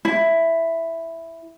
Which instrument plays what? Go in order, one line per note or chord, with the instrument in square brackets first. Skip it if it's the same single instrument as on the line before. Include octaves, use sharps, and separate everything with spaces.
[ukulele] E4